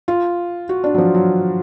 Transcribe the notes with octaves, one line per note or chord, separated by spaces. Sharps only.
F4
F#4
D4
F#3
F3
F#3